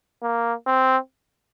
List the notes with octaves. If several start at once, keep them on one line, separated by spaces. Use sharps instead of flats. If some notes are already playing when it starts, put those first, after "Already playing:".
A#3
C4